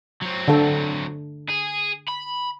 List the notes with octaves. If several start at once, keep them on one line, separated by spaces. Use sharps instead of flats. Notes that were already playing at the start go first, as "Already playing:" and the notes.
F#3 C4
D3 A4
G#4
B5